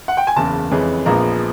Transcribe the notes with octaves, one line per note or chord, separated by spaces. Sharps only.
F#5
G5
G#5
F#1 E2 C#3 A5
F2 C#3 E3 G#3 C#4
A#1 A#2 F3 G#3 B3 A#5